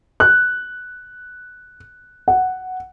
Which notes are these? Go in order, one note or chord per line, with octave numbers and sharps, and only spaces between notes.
F#6
F#5